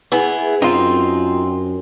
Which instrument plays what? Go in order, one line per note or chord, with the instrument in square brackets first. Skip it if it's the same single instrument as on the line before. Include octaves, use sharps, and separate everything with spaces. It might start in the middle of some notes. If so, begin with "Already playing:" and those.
[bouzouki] B3 E4 G#4
[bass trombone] F#2 [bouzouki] C4 [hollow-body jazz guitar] D#4 F4